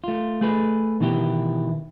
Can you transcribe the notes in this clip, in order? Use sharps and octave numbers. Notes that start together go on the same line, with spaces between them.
A3 F4
A3 G#4 B4
B2 D#3 E3 E4 G4